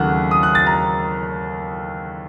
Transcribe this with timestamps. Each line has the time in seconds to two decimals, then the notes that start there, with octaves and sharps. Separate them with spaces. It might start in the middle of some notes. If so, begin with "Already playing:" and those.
Already playing: D#2 C#3 F#3 A3 F#5
0.31 D#6
0.43 F#6
0.55 A6
0.67 A#5